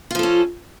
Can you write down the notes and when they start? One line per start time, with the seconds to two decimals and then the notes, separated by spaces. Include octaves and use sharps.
0.11 F4
0.15 F3
0.19 A4
0.23 C#4